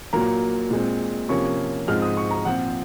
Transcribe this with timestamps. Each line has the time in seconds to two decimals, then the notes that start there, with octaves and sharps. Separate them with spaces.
0.13 A#2 F#3 A#3 A#5
0.71 A#2 G#3 C4
1.29 C3 F3 A#3 C#4 C#6
1.87 G#2 F3 G#3 C4 F6
2.02 D#6
2.17 C#6
2.31 A#5
2.45 A#2 F3 C4 F#5